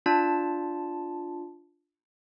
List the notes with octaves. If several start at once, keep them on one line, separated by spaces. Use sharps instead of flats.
D4 F4 A5